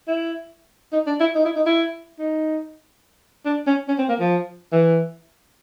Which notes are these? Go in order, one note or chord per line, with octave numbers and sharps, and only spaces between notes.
E4
D#4
D4
E4
D#4
E4
D#4
E4
D#4
D4
C#4
C#4
C4
A#3
F3
E3